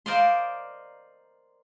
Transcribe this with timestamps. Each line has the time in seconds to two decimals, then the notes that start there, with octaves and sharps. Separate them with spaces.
0.06 A#4 C5 D5 D#5 F5 C6